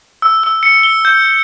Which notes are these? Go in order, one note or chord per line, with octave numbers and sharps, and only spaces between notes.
E6
E6
C#7
G7
G6